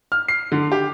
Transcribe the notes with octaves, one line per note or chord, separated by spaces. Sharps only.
F6
C7
D3
G4